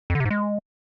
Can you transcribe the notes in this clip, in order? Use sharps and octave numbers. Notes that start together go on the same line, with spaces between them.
F2
D3
C3
G#2
G#3